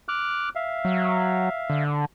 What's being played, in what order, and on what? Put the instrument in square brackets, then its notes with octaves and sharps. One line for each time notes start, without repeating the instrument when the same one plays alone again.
[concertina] D6 F6 F#6
E5 F5
[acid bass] F#3
D3